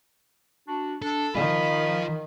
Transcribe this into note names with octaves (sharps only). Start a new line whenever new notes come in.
D4 F#4
D4 A4
D#3 F3 F4 D#5 F5 B5